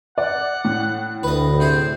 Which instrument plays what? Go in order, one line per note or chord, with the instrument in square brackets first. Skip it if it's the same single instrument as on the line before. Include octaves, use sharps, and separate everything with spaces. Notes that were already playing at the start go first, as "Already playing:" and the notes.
[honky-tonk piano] D5 [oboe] F#5
[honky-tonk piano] A2
[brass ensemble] D2 [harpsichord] B4 D#5
[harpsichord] C3 G#4 [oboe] C5